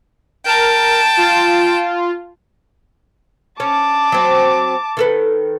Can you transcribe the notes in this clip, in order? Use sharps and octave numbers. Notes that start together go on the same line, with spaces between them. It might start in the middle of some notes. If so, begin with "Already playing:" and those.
A#4 G5 A5
F4
C#4 A5 D6
F#3 C4
D#3 A4 B4